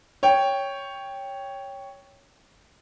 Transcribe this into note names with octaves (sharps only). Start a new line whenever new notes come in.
C#5 G5